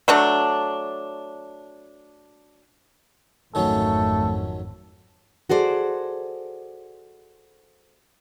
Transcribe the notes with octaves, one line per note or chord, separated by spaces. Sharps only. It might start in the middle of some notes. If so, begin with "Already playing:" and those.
F#3 A3 D4
G#1 F2 D#3 F#3 A3 C#4 A4
F#4 G#4 A4 C5 D5